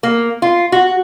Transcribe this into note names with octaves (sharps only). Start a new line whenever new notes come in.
A#3
F4
F#4